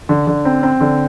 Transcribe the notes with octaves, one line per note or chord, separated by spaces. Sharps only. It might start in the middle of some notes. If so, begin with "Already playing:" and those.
D3
D3
C4
C4
D3